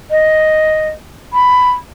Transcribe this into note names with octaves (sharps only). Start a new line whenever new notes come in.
D#5
B5